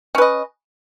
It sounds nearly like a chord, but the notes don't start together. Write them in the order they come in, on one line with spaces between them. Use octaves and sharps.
C#4 B4 D#5